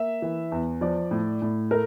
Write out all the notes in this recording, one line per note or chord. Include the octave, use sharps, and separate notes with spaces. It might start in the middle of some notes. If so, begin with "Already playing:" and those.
Already playing: A#3 E5
E3
E2
F3 D5
A2
A2
A3 A#4